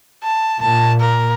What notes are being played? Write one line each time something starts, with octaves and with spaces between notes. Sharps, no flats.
A5
A#2 A5
A#4